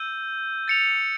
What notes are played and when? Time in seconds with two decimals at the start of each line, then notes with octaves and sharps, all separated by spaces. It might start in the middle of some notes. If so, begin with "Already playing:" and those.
Already playing: E6 G6 D#7
0.68 A6 C#7 F7